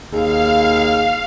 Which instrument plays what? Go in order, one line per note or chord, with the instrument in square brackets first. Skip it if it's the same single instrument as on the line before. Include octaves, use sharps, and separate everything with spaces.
[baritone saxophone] D#2 [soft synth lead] G#4 [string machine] F5